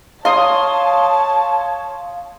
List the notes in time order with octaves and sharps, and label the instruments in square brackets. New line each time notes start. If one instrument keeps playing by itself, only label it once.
[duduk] C#5 [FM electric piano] F5 [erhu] A5 [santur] C6 D#6